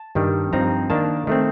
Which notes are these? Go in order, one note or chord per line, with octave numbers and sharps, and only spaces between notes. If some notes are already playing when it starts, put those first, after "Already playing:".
Already playing: A5
G2 D#3 G3
G2 F3 C4 D#4 A#5
D#3 A#3 D4 A5
D#3 A3 C4